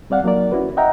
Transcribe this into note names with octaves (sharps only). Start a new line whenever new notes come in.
G3 C4 D5 F5 F#5
F#3 A#3 D#4 A#4 D5
C#4 E4 F#4 B4
D#5 E5 F#5 G5 A#5